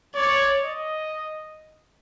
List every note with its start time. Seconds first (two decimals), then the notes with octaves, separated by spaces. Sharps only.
0.15 C#5 D5
0.64 D#5